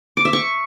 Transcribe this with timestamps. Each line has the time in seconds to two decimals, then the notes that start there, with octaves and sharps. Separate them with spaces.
0.17 D6
0.25 E5
0.33 C#6